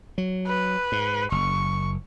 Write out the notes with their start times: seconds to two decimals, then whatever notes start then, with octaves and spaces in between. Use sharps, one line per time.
0.18 F#3
0.47 B4
0.92 G#2
1.32 F#1 C#6